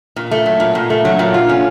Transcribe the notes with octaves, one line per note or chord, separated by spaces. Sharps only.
A#2
A3
F#3
A#2
A#2
A3
F#3
A#2
F4
C#4